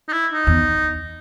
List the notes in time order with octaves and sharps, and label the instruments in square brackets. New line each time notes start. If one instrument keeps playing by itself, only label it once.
[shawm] D#4
E4
D#4
[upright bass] E2